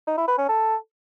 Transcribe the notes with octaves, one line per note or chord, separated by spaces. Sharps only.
D#4
E4
B4
C#4
A4